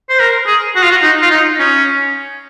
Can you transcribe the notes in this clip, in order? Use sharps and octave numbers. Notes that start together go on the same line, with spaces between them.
C5
A#4
G#4
F#4
F4
F#4
D#4
F4
D#4
C#4